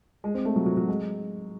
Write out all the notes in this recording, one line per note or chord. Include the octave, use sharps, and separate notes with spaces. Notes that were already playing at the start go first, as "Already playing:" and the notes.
G#3
C4
A3
F#3
F#3
F#3
G#3